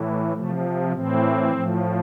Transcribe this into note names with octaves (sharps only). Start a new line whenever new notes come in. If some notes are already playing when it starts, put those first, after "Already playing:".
Already playing: A2 E3
C3 F3 A3
A2 E3 C4
A2 F3